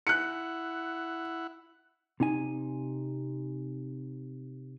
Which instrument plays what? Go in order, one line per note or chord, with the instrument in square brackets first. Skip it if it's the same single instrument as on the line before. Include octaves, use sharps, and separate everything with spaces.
[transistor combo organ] E4 F#5 [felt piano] F#6 C#7
[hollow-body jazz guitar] C3 D#4 G#5